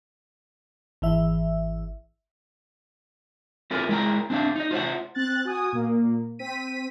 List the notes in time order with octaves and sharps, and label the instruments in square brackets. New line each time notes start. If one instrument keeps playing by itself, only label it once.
[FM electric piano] G#1 E3 E5
[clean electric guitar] C4 E4 F4 A4 A#4 G#5
G#3 E4 A#4 G5 A#5
C4 D4 E5 F5
D#4 D#5
F4 C5 E5 F#5
[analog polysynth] C4 F#6 A6
F#4 G#5 D#6
A#2 A#3
C4 B6 D#7